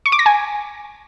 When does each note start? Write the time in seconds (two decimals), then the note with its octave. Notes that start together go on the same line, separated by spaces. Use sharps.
0.06 C#6
0.12 D6
0.19 A#6
0.26 G#5